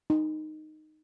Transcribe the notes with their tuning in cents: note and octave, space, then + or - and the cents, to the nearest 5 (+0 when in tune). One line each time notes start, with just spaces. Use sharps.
D#4 -10